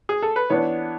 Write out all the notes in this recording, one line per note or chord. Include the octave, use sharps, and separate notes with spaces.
G#4
A4
B4
E3 B3 D4 C#5